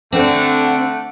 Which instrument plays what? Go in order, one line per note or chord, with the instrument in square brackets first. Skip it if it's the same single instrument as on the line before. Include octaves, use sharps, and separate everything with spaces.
[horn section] D3 [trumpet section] A3 F#5 D6 [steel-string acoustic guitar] C4